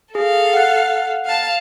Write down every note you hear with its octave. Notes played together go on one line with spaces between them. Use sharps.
G#4 A4 F5
F#5 F#6
F5 A5